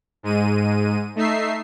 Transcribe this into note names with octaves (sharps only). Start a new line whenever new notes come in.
G#2 G#3 D#7
A3 D#4 E5 C7